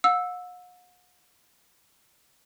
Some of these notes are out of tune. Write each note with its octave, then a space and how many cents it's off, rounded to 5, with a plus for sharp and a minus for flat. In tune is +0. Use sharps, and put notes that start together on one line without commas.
F#5 -45 E6 +0